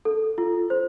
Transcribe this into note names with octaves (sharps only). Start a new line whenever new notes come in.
A4
F4
C5